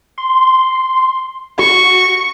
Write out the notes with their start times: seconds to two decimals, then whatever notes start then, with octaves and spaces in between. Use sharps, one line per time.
0.18 C6
1.59 F#4 C#6